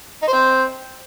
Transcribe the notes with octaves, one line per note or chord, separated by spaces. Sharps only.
D#4
C5
C4